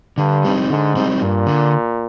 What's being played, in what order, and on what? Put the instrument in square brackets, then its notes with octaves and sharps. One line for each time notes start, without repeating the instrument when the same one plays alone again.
[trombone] G2 [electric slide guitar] D3
[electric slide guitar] G3 C4 D#4
[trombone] G#2 [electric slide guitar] D3
[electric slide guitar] G3 C4 D#4
[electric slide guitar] G2 [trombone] A#2
[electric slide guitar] D3